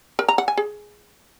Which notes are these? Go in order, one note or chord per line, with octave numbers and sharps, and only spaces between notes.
A#4
A#5
F#5
G#5
G#4